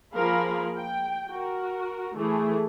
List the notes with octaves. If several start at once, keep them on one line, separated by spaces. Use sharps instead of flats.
F3 A#3 G#4 A#4 F5 B5
G5
F#4 A#4
E3 A3 G#4